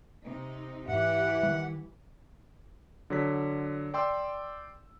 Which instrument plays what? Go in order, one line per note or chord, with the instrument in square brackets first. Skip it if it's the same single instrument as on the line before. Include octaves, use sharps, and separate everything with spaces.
[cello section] C3 D#4
[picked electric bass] G#2 [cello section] E3 G4 [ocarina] E5 [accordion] F#5
[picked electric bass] D#3 G3
[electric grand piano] D3 F#3 B6
D5 G5 C6 D6 E6